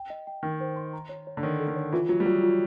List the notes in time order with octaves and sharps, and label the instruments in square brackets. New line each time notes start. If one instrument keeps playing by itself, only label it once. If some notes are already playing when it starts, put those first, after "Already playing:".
Already playing: [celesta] G5
D#5
G5
[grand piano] D#3 [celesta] G5
[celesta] C5
C6
A#5
C#5
C#5
[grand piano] D3
[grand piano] D#3 [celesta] C#5
[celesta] A4
[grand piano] D#3
[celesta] C#5
[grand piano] E3 [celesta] F4
[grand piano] F#3 [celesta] F4
[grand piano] G3
[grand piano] F#3 [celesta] F4
[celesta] F4